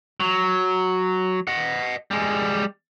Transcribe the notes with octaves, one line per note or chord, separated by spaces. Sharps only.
F#3
D#5 F#5
G3 G#3